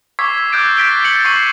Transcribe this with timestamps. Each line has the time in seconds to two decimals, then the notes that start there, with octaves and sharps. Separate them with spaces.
0.19 C#6 D6 E6 G#6 B6 C7
0.52 D6 E6 F#6 G6 A6 D7
0.77 A6 B6 D7 G7
1.04 C#7 F#7
1.25 C#6 B6 C7 D#7